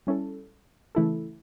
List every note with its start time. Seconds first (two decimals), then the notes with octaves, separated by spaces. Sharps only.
0.07 G3 C#4 E4 A4
0.95 C#3 E3 A3 E4 A4